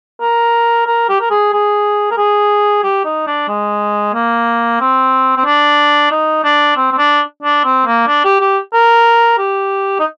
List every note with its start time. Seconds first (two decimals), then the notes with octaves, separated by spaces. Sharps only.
0.21 A#4
0.87 A#4
1.09 G4
1.21 A#4
1.30 G#4
1.53 G#4
2.11 A#4
2.17 G#4
2.84 G4
3.05 D#4
3.27 D4
3.48 G#3
4.14 A#3
4.81 C4
5.37 C4
5.45 D4
6.11 D#4
6.44 D4
6.76 C4
6.92 C4
6.98 D4
7.43 D4
7.64 C4
7.86 A#3
8.07 D4
8.25 G4
8.41 G4
8.74 A#4
9.38 G4
9.99 D#4